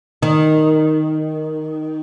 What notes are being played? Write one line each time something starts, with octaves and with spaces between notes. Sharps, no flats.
D#3